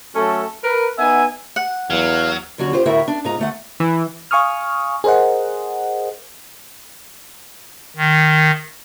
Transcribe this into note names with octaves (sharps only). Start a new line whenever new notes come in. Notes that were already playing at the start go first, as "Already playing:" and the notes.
F#3 A3 C#4 A4
A#4 B4
B3 D#4 E5 F#5 G#5
F#5
E2 F#3 F5 F6
D#2 D3 F#3 C#4 F#4
F4 G4 C5
D2 A2 E4 F#4 A#4 E5
D4
G#2 D#4 F4 A#5
D2 A3 F#5
E3
F5 G#5 C#6 D#6 F6
G#4 A#4 C5 D#5 F#5
D#3